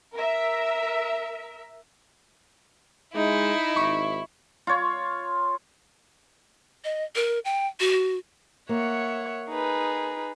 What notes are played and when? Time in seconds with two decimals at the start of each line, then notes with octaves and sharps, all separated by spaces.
0.15 A#4 E5
3.16 G#3 D#4 E4 E5
3.76 G#1 C#6
4.67 F4 C#5
6.84 D#5
7.16 A#4
7.45 G5
7.80 F#4
8.69 A#3 C#5 E5 F#5
9.50 D#4 G#4 B4